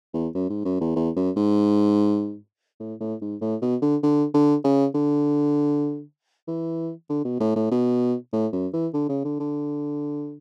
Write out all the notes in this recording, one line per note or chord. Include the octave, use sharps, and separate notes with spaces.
E2
F#2
G#2
F#2
E2
E2
F#2
G#2
A2
A2
G#2
A2
B2
D3
D3
D3
C#3
D3
E3
D3
B2
A2
A2
B2
A2
F#2
E3
D3
C#3
D3
D3